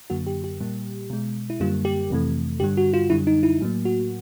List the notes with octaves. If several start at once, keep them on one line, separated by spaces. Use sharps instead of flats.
F#2 D3 F#3 A#3 F#4
G4
G4
A#2 G3 A#3
B2 G#3
E4
F#2 D3 G3 A#3 F4
G4
F2 C3 E3 A3
G2 D3 G3 G4
F#4
F4
F#2 D3 G3 E4
D#4
E4
A2 F#3 A#3
F#4